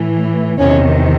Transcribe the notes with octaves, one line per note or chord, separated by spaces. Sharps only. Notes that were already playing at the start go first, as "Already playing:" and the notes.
Already playing: A2 E3
E2 C3 D#3 C#4